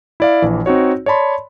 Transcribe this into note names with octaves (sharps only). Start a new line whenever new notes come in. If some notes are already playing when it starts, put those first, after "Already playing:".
E4 D5 F5
A#1 E3
C4 D#4 F#4 C#5
C#5 D5 A5 B5 C6